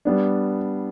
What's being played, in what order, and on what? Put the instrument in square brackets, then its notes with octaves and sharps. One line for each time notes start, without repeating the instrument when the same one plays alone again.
[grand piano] G3 B3 D4